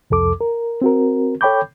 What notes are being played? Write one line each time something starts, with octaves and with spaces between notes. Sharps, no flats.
C2 F2 A4 D6
A#4
C4 F#4 A#4
A4 C#5 G5 B5 D6 G6